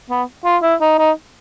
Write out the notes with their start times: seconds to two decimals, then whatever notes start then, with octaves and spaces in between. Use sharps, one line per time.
0.10 B3
0.45 F4
0.62 E4
0.81 D#4
0.99 D#4